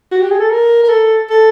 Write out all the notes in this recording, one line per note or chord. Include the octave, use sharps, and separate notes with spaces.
F#4
G4
G#4
A4
A#4
A#4
A4
A4